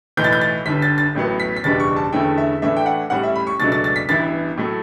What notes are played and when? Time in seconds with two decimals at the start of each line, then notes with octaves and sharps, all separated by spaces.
0.17 B1 A2 E3 G6
0.24 A6
0.33 G6
0.41 A6
0.66 G1 G2 D3 B6
0.82 A6
0.98 A6
1.15 A1 A2 F#3 B3
1.40 B6
1.56 B6
1.64 F#1 E2 B2 G3 D4 A6
1.80 C#6
1.96 A5
2.13 E2 D3 A3 C#4 E4 G5
2.38 E5
2.62 A2 E3 A3 D4 E5
2.77 G5
2.86 F#5
3.10 A1 A2 G3 C#4 F#5
3.23 E5
3.36 B5
3.47 C#6
3.59 C#2 B2 F#3 A3 D4 A6
3.72 A6
3.84 A6
3.96 B6
4.09 A1 G2 E3 B3 E4 A6
4.57 A2 F#3 A3